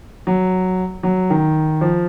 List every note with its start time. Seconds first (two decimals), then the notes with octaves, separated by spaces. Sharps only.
0.27 F#3
1.03 F#3
1.30 D#3
1.81 F3